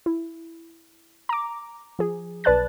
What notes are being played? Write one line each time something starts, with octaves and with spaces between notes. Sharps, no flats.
E4
A#5 D6
F3 G#4
B1 B4 D5 A5 F#6 A6